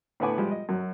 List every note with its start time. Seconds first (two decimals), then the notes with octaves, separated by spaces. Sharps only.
0.20 A2 D3 B3 F#5 G#5 D6
0.38 F3 G3 G#3 G4
0.51 D#5
0.69 F#2 F#3